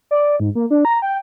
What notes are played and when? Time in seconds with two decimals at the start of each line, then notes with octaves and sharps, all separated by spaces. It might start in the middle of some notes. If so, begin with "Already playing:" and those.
0.11 D5
0.40 G#2
0.55 A#3
0.70 D4
0.85 A#5
1.02 G5